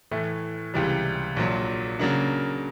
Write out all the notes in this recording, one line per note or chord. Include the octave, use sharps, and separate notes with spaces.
A2 E3 A3
C#2 C3 E3 G3
A#1 A#2 F#3
C#3 F#3 A#3 D4